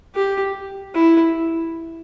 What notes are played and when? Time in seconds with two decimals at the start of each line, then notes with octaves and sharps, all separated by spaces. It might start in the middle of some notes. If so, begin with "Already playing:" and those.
0.15 G4
0.95 E4